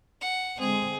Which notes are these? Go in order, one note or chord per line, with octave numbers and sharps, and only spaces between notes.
F#5
D3 G#3 C4 G#4